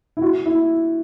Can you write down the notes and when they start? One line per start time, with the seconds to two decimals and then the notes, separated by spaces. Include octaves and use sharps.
0.17 E4
0.21 F#4
0.46 E4